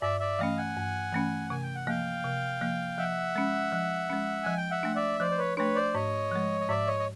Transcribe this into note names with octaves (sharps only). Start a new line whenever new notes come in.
G2 D5 E5
D5 E5
E3 A3 C#4 D#5 F5
F#5 G#5
G2
E3 A3 C#4
C3 G#5
G5
F#5
F3 A#3 F5 G5
C3
F3 A#3
F3 E5 F#5
G#3 C#4
F3
G#3 C#4
F3 G#5
G5
E5 F#5
A3 D4
D5 E5
F3 C5 D5
C5
B4 C#5
A3 D4 B4 C#5
C5 D5
G#2 C#5 D#5
F3 G#3
D#5
G#2 D5 E5
C#5 D#5
D#5